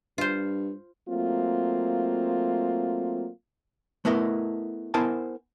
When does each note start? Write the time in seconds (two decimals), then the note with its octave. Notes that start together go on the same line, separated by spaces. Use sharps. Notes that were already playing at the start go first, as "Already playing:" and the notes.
0.18 G2 F4 C5
1.09 F#3 A3 A#3 C4 F4
4.05 A3 B3 E4 A#4 D#5
4.94 B3 E4 A#4 C5 G#5 A5